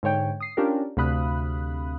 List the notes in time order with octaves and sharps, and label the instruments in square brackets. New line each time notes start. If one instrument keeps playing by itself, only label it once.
[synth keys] G#2 D3 C#5 G5
D#6 C7
C#4 D4 F4 G4 A#4
D2 C3 F5 B5 D#6 F#6